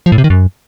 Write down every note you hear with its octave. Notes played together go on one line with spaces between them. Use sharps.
F3
A2
C3
D#3
F#2